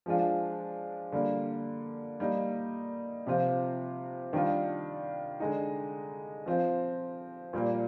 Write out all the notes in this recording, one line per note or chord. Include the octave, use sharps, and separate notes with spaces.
F3 G#3 D4 F4
D3 G3 A#3
G3 A#3 D#4
C3 F3 C4 F4
D#3 G3 D4 F4
D3 G#3 D#4
F3 C4 F4
A#2 G3 A#3